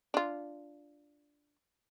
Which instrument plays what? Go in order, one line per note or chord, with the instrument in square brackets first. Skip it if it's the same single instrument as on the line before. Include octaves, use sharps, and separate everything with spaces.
[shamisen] D4 F4